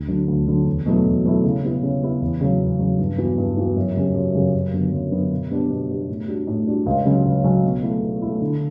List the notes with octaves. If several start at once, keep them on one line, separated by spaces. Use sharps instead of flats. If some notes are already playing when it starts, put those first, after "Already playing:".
Already playing: D2
D3 F#3
D2
D3 F#3
E2
B2 F#3 A3 E4
E2
B2 F#3 A3 E4
C#3
G3 B3 E4
C#3
G3 B3 E4
E2
C#3 F#3
E2
C#3 F#3
G2
E3 B3 F#4
G2
E3 B3 F#4
F#2
C#3 F#3 C#4 G4
F#2
C#3 F#3 C#4 G4
F#2
D3 F#3 B3
F#2
D3 F#3 B3
B2
G3 B3 D4 G4
B2
G3 B3 D4 G4
A2
G3 D4 F#4
A2
G3 D4 F#4
C#2
C#3 F#3 C#4
C#2
C#3 F#3 C#4
B2
A3 E4
B2
A3 E4
D3